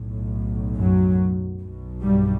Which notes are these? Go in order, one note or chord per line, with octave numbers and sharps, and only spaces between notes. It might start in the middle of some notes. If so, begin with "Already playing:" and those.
Already playing: B1 A2
F#2 F#3
B1 B2
G2 G3